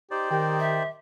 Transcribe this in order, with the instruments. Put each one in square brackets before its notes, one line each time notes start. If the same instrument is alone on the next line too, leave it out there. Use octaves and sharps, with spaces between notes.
[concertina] D#4 C5 D5 [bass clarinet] G4
[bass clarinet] D#3 [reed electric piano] G4 G5
[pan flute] E5